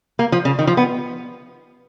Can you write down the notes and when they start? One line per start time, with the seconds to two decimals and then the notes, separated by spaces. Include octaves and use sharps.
0.19 A#3
0.32 F3
0.45 C#3
0.59 D#3
0.67 F3
0.77 B3